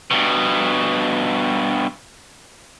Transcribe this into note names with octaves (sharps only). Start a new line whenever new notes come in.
G2 B2